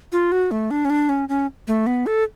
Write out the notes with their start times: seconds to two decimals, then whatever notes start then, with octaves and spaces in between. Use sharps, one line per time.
0.12 F4
0.32 F#4
0.51 A3
0.71 D4
0.85 C#4
0.90 D4
1.09 C#4
1.29 C#4
1.68 A3
1.87 B3
2.06 A4